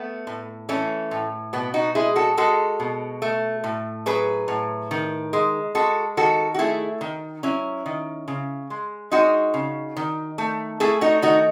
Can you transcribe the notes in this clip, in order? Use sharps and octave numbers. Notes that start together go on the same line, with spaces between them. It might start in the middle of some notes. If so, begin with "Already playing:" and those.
Already playing: A3 B3
A2
E3 A3 C#4
A2
B2 B3
D#4 F#4
G#3 E4 G#4
F#4 A4
G#3 F#4 A4
B2
A3
A2
F#3 G#4 B4
A2
D#3
G#3
G#3 F#4 A4
D#3 F#4 A4
F#4
A3 E4 G#4
D#3
F#3 C#4 E4
D#3
C#3
G#3
G#3 D#4 F#4
C#3
D#3
A3
A3 E4 G#4
D#4 F#4
D#3 D#4 F#4